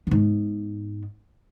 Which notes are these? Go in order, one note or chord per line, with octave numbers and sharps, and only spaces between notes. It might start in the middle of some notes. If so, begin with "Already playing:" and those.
G#2 B3